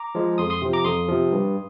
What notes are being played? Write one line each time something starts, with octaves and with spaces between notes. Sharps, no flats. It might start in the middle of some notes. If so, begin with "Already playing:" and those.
Already playing: A#5 D6
F3 G#3
F2 C6 D#6
C6 D#6
C3 F3
A#5 D6
F2 C6 D#6
C3 F3
G2